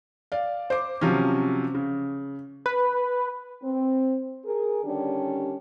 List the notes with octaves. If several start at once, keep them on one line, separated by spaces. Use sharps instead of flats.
D5 F5
C5 D6
C3 F3 F#3 C#4
C#3
B4
C4
G#4 A#4
D3 D#3 G3 C#4 D4 G4